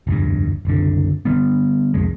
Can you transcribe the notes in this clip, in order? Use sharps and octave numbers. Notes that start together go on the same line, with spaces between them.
F1 D2 G2
F#1 C2 D3
D3 G3 B3
C2 F2 G#3